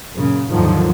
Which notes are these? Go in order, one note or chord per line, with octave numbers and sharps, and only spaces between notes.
F#2 A#2 C#3
D#2 G#2 D3 D#3 F3 F#3